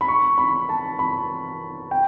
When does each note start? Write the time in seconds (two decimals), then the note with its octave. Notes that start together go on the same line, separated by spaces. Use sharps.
0.01 B5
0.08 C#6
0.38 B5
0.69 A5
0.99 B5
1.91 G5